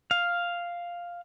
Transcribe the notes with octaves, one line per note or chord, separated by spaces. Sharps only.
F5